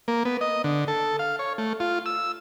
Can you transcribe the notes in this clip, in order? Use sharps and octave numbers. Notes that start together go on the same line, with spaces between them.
A#3
B3
D#5
D3
A4
F5
C#5
A3
F4
E6